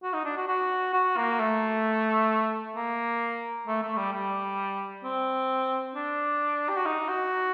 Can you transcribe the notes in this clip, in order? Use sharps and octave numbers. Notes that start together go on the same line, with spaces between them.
F#4
D#4
D4
F#4
F#4
F#4
A#3
A3
A#3
A3
A3
G3
G3
C4
D4
G4
F#4
D#4
F#4